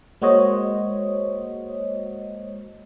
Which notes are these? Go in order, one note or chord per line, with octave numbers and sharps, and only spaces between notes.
G#3 A#3 F#4 C5 C#5 D#5